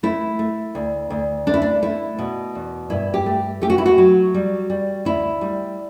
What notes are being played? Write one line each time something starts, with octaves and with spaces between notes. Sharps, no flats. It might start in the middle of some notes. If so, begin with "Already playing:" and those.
A3 E4
A3
D2
D2
A3 D4
E4
D4
A3 E4
B2
E2
G2 E4
G4
A3
A3 G4
F#4
E4
F#4
F#3
G3
G3
D2 E4
G3